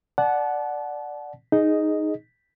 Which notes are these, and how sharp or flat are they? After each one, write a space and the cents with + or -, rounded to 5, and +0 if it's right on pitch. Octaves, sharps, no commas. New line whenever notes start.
D5 +0 F#5 +0 A5 -30
D#4 +0 G#4 +0 D#5 +0